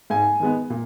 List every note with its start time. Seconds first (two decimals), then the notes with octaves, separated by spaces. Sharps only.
0.10 G#2 G#5
0.40 D#3 G#3 B3
0.70 A#2